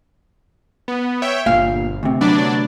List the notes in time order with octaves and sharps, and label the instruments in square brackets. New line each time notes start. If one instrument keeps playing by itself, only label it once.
[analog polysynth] B3
C#5 E5 G5
[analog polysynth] G1 [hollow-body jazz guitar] A#2 [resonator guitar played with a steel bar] F5
[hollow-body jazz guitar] D2 C3
[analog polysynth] F#3 D4 D5 [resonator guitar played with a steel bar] B3